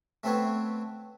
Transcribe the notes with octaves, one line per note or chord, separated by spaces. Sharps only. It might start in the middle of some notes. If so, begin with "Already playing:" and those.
A3 B3 C4 A4 B4 C#5